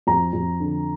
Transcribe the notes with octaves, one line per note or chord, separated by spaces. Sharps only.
F2 A#5
F2
D3